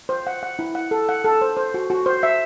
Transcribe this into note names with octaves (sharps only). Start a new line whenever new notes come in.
C5
F#5
F#5
E4
F#5
A4
F#5
A4
C5
C5
F#4
F#4
C5
E5